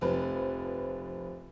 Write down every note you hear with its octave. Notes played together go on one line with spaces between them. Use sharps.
F1 F3 B4